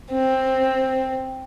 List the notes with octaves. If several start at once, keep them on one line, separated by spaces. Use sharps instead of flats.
C4